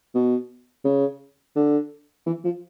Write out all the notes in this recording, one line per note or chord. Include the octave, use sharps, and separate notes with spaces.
B2
C#3
D3
E3
F3